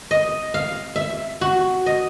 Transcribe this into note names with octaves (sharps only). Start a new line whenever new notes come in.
D#5
F5
E5
F#4
D#5